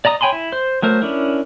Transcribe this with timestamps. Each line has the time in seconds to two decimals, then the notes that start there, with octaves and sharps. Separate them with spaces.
0.05 D5 D#5 A#5 D#6
0.21 C#5 G5 G#5 B5 C6
0.32 E4
0.52 C5
0.82 F#3 A3 A#4 C5
1.02 C#4 D4 E4 A#4